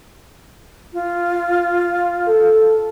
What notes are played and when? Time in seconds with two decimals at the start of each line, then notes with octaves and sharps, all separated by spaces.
0.93 F4
2.28 A4